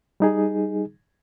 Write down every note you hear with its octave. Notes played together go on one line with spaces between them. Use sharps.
G3 D#4 G#4